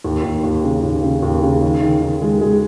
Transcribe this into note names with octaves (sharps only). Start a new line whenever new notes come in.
D#2
D#2
D#2
C#3
D#2
C#3
D#2
C#3
D#3
D#3
D#3
G#3
G#3